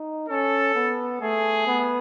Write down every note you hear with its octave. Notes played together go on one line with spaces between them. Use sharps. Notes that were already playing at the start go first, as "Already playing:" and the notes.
Already playing: D#4
C#4 A4
B3
A3 G#4
B3